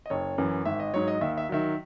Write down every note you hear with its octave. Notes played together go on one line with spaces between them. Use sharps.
D#5
F#1 C#5
F#2 E3
G#1 E5
D#5
G#2 F#3 C#5
D#5
D#2 E5
E5
D#3 F#3 E5